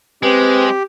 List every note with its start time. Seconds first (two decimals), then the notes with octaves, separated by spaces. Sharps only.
0.23 G#3 C4 G4 B4